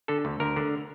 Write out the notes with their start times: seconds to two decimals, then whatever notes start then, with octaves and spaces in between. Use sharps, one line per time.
0.08 D3 A4
0.25 D2
0.40 D2 A#4
0.56 D3